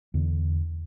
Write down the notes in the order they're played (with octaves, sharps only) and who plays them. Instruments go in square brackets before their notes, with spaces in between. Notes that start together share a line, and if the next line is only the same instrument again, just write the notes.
[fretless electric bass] E2 D3